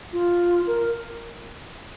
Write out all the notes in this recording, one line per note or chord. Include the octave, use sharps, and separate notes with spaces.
F4
A#4